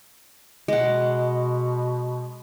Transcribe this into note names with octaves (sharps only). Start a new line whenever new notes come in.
B2 G#3 F#5